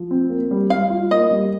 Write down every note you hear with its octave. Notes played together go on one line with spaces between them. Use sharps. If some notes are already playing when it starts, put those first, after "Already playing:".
Already playing: F3
C4
A#3
G3
G3 F5
F4
A#3 D#5
G3